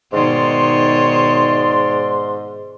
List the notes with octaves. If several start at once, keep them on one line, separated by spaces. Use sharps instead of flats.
G#2 B2 D#3 C#5 D5 C6